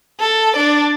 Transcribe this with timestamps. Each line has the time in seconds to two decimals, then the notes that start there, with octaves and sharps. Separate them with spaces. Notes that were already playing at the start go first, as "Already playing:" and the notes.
0.20 A4
0.56 D4 D5